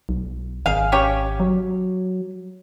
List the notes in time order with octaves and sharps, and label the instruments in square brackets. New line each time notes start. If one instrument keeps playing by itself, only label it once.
[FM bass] B1
[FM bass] G#1 [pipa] G#4 F5
[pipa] C#4 G4 C#5
[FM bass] F#3